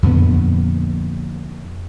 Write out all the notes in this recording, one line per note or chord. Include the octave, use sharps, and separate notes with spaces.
F2 A#2 D3 B3